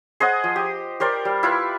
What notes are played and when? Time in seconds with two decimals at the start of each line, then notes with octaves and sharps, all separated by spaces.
0.20 G#4 C5 D#5 F#5
0.44 F3
0.56 G4
1.00 G4 A#4 C5 D5
1.25 G3
1.43 E4 F4 B4